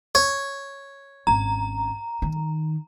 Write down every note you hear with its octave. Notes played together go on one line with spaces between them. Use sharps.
C#5
G#1 C#4 A#5
D#3